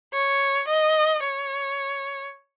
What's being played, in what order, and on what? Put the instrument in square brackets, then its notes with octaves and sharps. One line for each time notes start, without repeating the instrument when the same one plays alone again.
[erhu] C#5
D#5
C#5